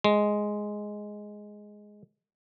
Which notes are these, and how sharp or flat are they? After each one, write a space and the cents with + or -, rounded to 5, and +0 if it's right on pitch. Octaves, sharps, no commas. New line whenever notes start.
G#3 +5